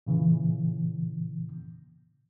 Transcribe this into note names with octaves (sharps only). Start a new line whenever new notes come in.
A#2 C#3 E3